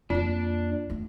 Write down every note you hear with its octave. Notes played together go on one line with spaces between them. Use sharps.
F2 A#3 D4 F4
A3 B3